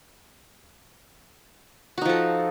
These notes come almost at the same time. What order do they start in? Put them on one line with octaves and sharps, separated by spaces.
F#4 D#4 F3 A4